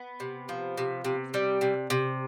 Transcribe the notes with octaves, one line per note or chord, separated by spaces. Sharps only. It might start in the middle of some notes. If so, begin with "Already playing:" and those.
Already playing: B3
C3
F3
C3
C3
G3
C3
C3